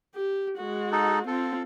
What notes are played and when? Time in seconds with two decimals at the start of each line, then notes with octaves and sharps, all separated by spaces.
0.15 G4
0.58 G#3 F#4
0.92 D#4 A4
1.27 C4 F4 A4